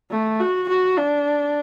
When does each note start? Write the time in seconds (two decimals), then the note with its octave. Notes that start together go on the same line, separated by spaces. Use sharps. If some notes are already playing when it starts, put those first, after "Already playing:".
0.11 A3
0.40 F#4
0.69 F#4
0.97 D4